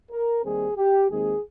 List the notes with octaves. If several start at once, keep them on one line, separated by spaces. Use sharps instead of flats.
A#4
D#2 D#3 G3 C4 G#4
G4
D#2 D#3 G#3 C4 G#4